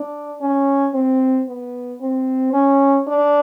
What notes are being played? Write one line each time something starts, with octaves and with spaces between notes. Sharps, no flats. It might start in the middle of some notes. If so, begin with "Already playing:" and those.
Already playing: D4
C#4
C4
B3
C4
C#4
D4